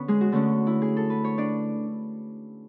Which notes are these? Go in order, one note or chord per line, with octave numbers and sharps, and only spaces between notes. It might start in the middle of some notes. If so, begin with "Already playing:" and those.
Already playing: D3 B3 C#4 B4 C#5
G#3 G#4
F#4
D3 A3 C#4
E4
G#4
A4
B4
C#5
D4 D5